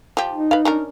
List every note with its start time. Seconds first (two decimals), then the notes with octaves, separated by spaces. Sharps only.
0.17 F3 G4
0.33 D#4
0.51 B4 F5
0.65 C#4 D4 A#4